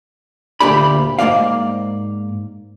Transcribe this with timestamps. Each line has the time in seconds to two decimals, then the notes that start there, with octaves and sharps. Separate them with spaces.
0.60 D2 A#2 G4 D5 B5
1.19 G#2 F3 A#3 D5 F5